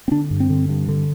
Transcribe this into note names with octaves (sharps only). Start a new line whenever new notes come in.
C4
D3 D4
G2
C4
D3
G2
D3